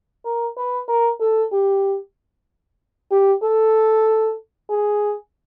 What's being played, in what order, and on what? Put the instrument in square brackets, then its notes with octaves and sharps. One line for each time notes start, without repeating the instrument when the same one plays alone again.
[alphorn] A#4
B4
A#4
A4
G4
G4
A4
G#4